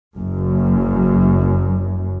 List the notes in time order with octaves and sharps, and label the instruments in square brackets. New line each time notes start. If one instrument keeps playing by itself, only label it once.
[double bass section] F#1 F#2